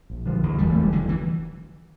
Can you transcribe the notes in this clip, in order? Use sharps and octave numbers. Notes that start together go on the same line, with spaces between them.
A#1
D3 F3
E2
F1 G3
A3
F1
G3
D2 D3
E3